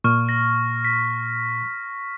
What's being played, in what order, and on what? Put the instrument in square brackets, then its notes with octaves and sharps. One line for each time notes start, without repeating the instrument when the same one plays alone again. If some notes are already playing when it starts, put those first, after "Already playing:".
[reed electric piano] A#2 [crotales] C#6 F6
[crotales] A#6
B6